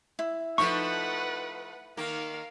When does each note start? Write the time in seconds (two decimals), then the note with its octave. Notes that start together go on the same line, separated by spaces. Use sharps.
0.19 E4
0.58 F3 A3 D#4 B4 F#5 C#6
1.97 D#3 A#3 A#4 F5